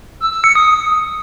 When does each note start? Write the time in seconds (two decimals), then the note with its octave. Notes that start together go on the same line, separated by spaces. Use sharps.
0.21 E6
0.32 E6
0.44 C#7
0.55 D#6